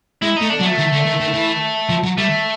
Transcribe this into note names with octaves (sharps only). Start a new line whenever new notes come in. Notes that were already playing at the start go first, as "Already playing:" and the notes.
G#3 E4
A3 D#4
D4
F#3
A3
D#3
D3
D#3
D#3
E3
F3
F#3
G3 A3